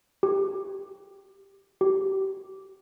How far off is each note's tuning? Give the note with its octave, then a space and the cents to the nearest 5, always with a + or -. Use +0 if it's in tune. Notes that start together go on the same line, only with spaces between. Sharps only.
G4 +0
G4 -30